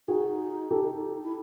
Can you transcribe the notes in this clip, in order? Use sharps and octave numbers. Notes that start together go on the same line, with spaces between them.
D#4 F#4 G#4
G4 A4
E4